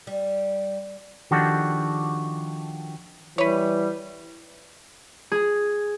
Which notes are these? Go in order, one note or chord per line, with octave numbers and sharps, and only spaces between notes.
G3
D#3 F3 D4 F#4 G4 A4
E3 G3 B4 C#5
G#4